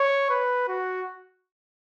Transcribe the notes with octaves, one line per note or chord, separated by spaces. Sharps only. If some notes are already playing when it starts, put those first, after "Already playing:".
Already playing: C#5
B4
F#4